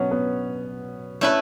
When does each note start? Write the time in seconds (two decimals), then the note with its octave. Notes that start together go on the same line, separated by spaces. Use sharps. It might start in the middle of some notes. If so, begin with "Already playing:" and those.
Already playing: B2 F#3 B3 C#4
0.11 B3
1.21 A3 C#4 E4 B4